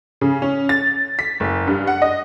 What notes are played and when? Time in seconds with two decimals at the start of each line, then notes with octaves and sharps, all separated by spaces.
0.21 C#3
0.42 C#4
0.69 A6
1.19 B6
1.40 F#1
1.67 G2
1.87 F#5
2.02 D#5